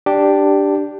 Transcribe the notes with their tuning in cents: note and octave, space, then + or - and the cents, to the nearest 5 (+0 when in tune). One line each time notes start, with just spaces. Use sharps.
D4 +0 G4 +0